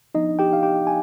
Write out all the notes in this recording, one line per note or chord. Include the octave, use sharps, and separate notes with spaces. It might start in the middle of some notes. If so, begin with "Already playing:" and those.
F3 B3 D4 D#4 D#5
G4 G5
F5
G4 G5
G#5